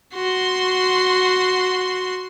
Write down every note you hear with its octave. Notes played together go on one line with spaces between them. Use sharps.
F#4 C6